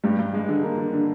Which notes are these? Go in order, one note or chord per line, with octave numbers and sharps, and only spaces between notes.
G2 G3
G2
G2 G#3
D3
D3 A#3
D3
D3